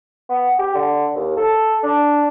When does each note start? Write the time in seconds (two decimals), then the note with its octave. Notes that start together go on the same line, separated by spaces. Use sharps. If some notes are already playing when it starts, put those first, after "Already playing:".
0.29 B3
0.59 G4
0.75 D3
1.15 D#2
1.37 A4
1.83 D4